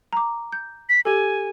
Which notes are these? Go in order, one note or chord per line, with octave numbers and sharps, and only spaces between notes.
A#5 D6
G6
B6
G4 A4 G#5